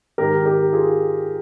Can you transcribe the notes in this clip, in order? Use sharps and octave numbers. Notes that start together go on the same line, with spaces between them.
G#2 D#3 G4 A#4
G4 A#4
F4 G#4